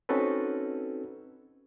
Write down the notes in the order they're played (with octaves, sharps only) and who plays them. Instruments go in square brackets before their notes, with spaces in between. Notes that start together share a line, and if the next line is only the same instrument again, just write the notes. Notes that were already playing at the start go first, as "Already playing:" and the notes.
[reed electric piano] C4 C#4 D#4 F#4 A4 B4